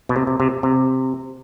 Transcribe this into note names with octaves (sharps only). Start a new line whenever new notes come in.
B2
C3
C3
C3
C3